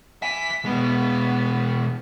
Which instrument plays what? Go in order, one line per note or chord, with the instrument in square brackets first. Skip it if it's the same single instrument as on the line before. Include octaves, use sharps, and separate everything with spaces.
[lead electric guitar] E5 G#5 [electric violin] B6
[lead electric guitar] B2 G#3 [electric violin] B3